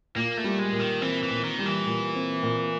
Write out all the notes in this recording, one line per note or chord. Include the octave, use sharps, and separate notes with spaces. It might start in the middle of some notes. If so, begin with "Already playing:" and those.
A#2 A#3
A3
G3
G#3
A#2
D#3
E3 C4
E3
A#2
D#3
G3
E3
A#2
C4
A#2